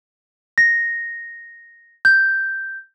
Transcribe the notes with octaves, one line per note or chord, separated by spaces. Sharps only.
A#6
G6